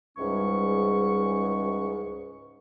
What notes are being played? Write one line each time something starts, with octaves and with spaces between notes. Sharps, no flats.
C#2 G#2 E3 G3 C#4 C#6